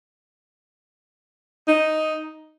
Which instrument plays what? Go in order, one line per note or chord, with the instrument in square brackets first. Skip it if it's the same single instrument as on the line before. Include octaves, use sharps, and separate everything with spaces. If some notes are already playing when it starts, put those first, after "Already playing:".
[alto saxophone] D#4